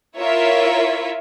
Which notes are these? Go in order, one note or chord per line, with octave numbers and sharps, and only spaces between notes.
E4 F4 A#4 C#5 E5